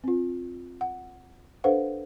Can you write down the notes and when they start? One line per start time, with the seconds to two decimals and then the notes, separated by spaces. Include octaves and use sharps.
0.04 C4 F4
0.81 F#5
1.64 D4 A4 B4 C5 F5 F#5